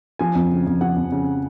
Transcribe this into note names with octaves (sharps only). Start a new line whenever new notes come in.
F3 G#5
F2
C#3
F2
F3 F#5
F2
C#3